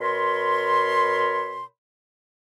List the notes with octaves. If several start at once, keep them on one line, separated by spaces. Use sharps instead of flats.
B2 A#4 C#5 B5 C6